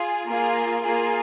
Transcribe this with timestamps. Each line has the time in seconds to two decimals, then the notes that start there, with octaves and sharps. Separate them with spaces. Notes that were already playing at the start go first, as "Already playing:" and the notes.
Already playing: F4 G#4
0.28 A#3 F4 G#4
0.81 A#3 F4 G#4